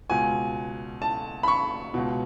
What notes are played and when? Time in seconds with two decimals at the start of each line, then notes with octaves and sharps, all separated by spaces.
0.10 C#2 B2 G#5
1.02 A5
1.43 B5
1.48 C#6
1.94 C#2 B2